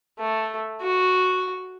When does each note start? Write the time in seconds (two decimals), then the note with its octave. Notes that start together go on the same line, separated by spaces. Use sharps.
0.19 A3
0.82 F#4